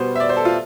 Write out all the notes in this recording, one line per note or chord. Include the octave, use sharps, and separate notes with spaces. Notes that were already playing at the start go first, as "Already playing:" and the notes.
Already playing: B2 G3 B3 C5
E5
D5
C5
A4
F4